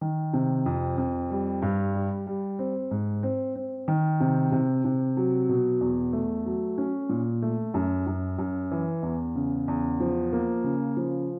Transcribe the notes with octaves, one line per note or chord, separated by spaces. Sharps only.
D#3
C3
F2
F2
G3
G2
G3
G3
C4
G#2
C4
C4
D#3
C3
C3
C3
F#3
B2
E2
A3
F#3
C#4
A#2
A3
F#2
F#2
F#2
E3
E2
C#3
E2
F3
A#3
C#3
F3